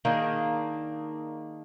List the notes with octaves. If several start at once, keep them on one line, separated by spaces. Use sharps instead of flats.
D#3 A#3 D4 G#4